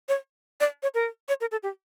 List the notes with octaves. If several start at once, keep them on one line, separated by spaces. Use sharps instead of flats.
C#5
D5
C#5
A#4
C#5
A#4
A4
G4